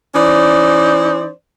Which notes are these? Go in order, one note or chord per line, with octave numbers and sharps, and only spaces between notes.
E3 C#4 D#4 C5 D5